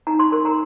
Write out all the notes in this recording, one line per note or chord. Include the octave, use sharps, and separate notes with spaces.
D#4 A#5
C6
A#4 C6
A#5